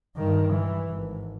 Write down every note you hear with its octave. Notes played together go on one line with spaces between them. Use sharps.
G2 D#3
E3
G#1